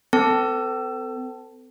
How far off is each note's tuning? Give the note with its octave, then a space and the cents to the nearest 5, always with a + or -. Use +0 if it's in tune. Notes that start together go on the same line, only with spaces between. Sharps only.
C4 -45 A4 +25 A5 +0